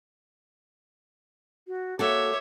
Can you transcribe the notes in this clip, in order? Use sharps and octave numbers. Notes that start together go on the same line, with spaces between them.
F#4
A#3 F#4 A4 C#5 E5 D6